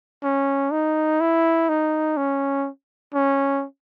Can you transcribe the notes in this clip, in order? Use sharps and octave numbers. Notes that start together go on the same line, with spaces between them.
C#4
D#4
E4
D#4
C#4
C#4